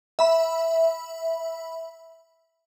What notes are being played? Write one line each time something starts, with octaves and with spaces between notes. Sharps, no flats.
E5 B5